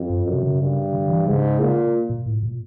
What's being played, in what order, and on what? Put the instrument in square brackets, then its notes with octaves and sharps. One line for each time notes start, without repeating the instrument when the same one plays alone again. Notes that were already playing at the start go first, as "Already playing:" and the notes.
Already playing: [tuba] F2
[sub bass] F#2
[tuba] F#2
[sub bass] C3
C#3
[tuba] G2
[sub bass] D3
E3
[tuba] G#2 [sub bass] C#3
[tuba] A#2
[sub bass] A#2
A2
A#2